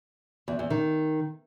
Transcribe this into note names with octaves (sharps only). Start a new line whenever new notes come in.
E2
E2
D#3